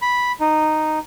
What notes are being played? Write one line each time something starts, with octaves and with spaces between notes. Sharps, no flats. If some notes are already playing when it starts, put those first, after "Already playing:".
B5
D#4